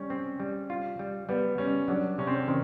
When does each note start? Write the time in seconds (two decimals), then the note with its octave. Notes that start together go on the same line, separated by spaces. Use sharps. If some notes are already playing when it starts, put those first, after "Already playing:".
Already playing: G3 C#4
0.10 C4
0.40 G3
0.70 F4
0.99 G3
1.29 G3 B3
1.58 G3 C#4
1.88 F#3 D4
2.18 C3 C#4
2.27 C4
2.35 C#4
2.48 D#3 C4